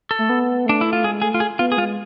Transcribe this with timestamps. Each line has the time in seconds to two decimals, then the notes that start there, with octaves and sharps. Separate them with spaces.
0.11 A4
0.19 A3
0.29 B3
0.66 A3 D4
0.81 E4
0.93 F4
1.03 G#3 G#4
1.22 A3 G#4
1.34 F4
1.40 G#4
1.59 B3 F4
1.72 G#4
1.77 G#3 F4